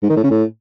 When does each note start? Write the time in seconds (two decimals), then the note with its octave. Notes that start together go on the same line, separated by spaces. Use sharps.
0.03 G#2
0.10 D#3
0.17 A2
0.24 C#3
0.31 A2